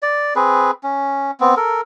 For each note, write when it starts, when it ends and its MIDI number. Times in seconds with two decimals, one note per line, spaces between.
0.02 0.34 74
0.36 0.71 60
0.36 0.71 68
0.36 0.71 71
0.83 1.31 61
1.40 1.55 59
1.40 1.55 60
1.57 1.81 69
1.57 1.81 70